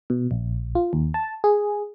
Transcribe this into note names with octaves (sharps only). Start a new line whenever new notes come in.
B2
A#1
F4
D#2
A5
G#4